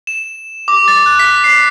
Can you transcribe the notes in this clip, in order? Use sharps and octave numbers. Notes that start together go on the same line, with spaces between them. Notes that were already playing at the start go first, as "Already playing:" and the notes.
E7
D6
A6
F#6
B6
C7